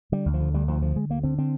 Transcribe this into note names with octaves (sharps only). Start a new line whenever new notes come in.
D3 G3
D2
F3
D3
D2 G3
D2 F3
D3 F3
D3 G#3
D2 A#3
D3 C4
D3 C4